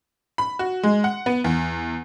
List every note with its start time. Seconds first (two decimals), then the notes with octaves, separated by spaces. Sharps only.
0.38 B5
0.59 F#4
0.83 G#3
1.04 F#5
1.26 B3
1.44 E2